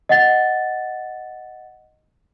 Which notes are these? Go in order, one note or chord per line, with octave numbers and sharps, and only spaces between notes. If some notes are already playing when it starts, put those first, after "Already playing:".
D#5 F#5 A6